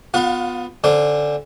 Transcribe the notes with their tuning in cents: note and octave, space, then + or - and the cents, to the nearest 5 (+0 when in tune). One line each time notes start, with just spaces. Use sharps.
B3 +10 F4 +30 F5 +45
D3 +0 C#4 -25 C5 +10